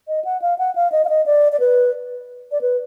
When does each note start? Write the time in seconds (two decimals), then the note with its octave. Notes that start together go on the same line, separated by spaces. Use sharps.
0.08 D#5
0.25 F#5
0.42 F5
0.58 F#5
0.75 F5
0.92 D#5
1.05 F5
1.09 D#5
1.26 D5
1.52 D5
1.60 B4
2.52 D5
2.61 B4